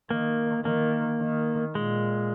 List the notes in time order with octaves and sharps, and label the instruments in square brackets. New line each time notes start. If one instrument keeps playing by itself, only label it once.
[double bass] D#3 [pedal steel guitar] A#3
[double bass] D#3 [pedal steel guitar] A#3
[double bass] D#3
[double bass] A#2 [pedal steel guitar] G#3